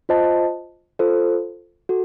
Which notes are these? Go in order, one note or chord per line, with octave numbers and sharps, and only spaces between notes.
F4 C5 D#5 A5
F4 A4 C5
F#4 A4